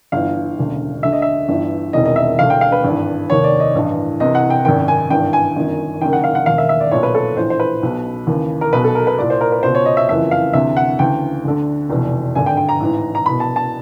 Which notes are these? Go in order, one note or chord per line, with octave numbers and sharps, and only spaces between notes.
G1 G2 E3 F5
E1 D2 C#3
D2 D3 E5
D#5
E5
G1 G2 E3
E1 E2 C3 D#3 D#5
D#5
E5
E1 D2 D3 F5
G5
F5
B4
G#1 G2 E3
F1 D#2 D#3 C#5
D5
D#5
A1 G2 E3
C2 C3 E3 D#5
F#5
G5
G#1 F#2 D#3 G5
G#5
G#1 G2 E3 G5
G#5
G1 F#2 D#3
F#1 F#2 D#3 G5
F#5
F5
F#5
E1 D#2 D#3 F5
E5
E5
D5
B1 A#2 C#5
B4
A4
A#1 A2 E3 C5
C5
B4
B1 B2
D#2 C#3 E3
A#4
B1 B2 B4
A4
A#4
B4
C2 A#2 D5
C5
A#4
B4
C#2 B2 C5
C#5
D#5
E5
F#1 F2 C#3 E3 E5
F5
D2 C3 E3 E5
F#5
D2 C#3 E3 G5
D2 D3
F1 E2 B2
G#1 G2 D3 G#5
G5
G5
A#5
A1 G#2 E3
A#5
C2 B2 B5
A5
A5